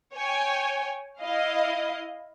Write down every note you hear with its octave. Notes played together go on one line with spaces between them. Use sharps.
C#5 G5 G#5
E4 D#5 F5